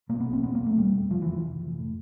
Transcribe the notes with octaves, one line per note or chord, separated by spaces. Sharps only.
B2 A#3
B3
B1
C4
E1 B3
A#3
E1
A3
E1 G3
E1
F1 F3
E3
F1
E3
F1
F1
A2